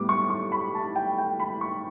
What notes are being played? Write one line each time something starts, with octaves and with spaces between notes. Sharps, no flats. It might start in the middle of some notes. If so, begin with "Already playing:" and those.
Already playing: A2 G3 B3 D6
C#6
C#6
B5
A5
G5
G5
B5
C#6